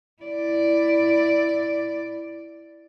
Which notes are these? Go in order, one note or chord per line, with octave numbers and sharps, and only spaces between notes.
E4 D5